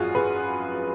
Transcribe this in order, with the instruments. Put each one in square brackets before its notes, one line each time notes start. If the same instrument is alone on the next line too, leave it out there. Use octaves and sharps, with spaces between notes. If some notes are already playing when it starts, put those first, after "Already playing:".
Already playing: [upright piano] G#1 F#2 F3 F4 F#4 G#4
G#4 B4